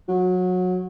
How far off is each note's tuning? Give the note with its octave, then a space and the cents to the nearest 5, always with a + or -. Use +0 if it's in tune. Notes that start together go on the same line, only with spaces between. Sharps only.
F#3 -20